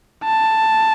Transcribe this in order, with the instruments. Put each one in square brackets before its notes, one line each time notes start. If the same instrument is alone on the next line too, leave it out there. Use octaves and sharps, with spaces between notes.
[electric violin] A5